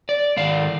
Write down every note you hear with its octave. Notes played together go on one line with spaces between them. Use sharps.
D5
G#2 D#3 F5